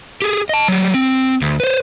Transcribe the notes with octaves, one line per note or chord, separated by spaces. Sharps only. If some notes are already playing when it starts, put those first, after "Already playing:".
G4 G#4
D#5 A5
F#3 G3
C4
D2
B4 C5